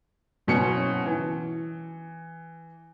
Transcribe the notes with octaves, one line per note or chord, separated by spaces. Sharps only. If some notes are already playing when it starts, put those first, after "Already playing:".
F#1 B2 C#4 C#7
E3